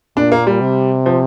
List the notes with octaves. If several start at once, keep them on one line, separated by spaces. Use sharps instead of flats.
A#2 D4
A#3
G3
C3
F3